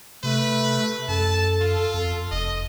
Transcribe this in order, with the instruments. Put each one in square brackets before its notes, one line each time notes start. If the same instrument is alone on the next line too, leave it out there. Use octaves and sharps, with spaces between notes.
[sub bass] C3 [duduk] A3 [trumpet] B4
[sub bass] F#2 [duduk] A4 [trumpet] A5
[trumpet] F4
[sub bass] F2
[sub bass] F1 [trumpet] D#5